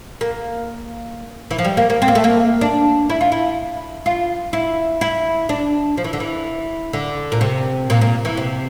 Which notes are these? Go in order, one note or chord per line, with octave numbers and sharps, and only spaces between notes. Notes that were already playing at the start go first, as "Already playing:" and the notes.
A#3
E3
F3
G3
A#3
A#3
C4
A#3
A3
A#3
D4
E4
F4
E4
F4
E4
E4
D4
F3
E3
D3
E3
D3
A#2
C3
A#2
A#2
E3
C3